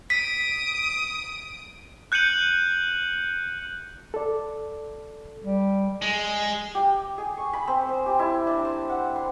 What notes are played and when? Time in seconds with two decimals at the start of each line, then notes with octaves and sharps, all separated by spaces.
0.10 D#6 B6 D7
2.12 F#6 G6 C#7 D#7 F#7
4.14 A4 D5
5.42 G3
6.02 G#3
6.75 G4
7.18 G#4
7.37 C#6
7.53 B5
7.67 C4
7.89 C5
8.06 G4
8.19 E4
8.47 D4
8.65 C5
8.90 F#5
9.16 C6